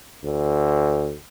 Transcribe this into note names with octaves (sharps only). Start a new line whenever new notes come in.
D2